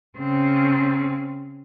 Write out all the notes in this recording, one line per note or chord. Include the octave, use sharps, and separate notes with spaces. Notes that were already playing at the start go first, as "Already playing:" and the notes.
C#3 C4